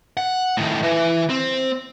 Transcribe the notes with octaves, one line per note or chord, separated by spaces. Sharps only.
F#5
A2 D#3
E3
C4